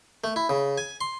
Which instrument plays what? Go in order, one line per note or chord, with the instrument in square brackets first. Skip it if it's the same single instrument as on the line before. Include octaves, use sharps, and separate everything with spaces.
[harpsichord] A3
E4
C#3
G#5
C6